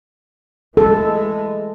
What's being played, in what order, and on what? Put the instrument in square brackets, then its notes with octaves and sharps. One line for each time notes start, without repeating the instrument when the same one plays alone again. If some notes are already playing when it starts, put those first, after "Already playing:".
[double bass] E3 G#3 [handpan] A4